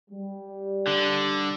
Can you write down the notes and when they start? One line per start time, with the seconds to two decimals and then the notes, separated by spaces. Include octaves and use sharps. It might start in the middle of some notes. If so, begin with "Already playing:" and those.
0.10 G3
0.87 D3